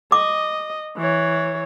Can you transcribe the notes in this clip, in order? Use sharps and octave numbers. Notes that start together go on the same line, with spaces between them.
D#5 D6
E3 C#5